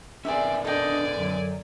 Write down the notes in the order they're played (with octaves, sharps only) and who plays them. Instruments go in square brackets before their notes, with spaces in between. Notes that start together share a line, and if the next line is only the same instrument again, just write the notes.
[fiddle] C4 D5 [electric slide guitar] C#4 A#4 B4 [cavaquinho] G#4 E5
[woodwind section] D4 D#5 [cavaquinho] A4 G5 [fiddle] D5 G#5
[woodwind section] F#2 D3 F#3